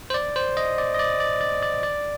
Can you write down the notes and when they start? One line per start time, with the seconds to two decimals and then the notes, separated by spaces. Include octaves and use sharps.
0.10 C5
0.14 D5
0.36 C5
0.57 D#5
0.78 D5
0.94 D#5
0.99 D5
1.20 D5
1.41 D5
1.62 D5
1.83 D5